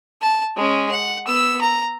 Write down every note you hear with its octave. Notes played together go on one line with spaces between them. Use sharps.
A5
G#3 C#4
F#5
B3 E6
A#5